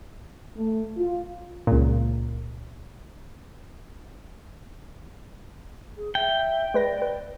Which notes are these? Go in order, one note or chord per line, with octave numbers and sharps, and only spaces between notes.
A3
F4
C#2 A#2
G#4
E5 G5
G#3 B4 D5 A#6
B4